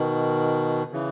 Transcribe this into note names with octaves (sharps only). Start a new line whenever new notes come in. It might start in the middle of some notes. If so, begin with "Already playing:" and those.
Already playing: B2 D#3
C#3 E3